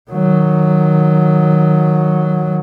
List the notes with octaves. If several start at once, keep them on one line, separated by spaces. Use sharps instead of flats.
D#3 F#3